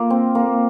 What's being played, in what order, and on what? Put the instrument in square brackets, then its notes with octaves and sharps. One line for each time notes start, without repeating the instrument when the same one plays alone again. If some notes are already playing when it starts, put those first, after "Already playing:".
Already playing: [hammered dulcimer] A#3 F4
C4
A#3